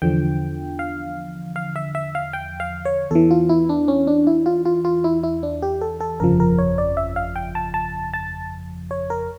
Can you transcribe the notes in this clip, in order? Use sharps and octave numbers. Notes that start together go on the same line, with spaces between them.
E2 D3 F3 G5
F5
F5
E5
E5
F5
G5
F5
C#5
E2 E3 A4
F4
E4
D4
C#4
D4
E4
F4
F4
F4
E4
E4
D4
G4
A4
A4
G1 F2 C#3 F3 A#4
A#4
C#5
D5
E5
F5
G5
A5
A5
A5
C#5
A#4